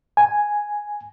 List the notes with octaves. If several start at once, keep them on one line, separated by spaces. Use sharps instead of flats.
G#5